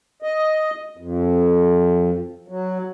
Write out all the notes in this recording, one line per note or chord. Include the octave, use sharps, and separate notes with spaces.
D#5
F2
F#3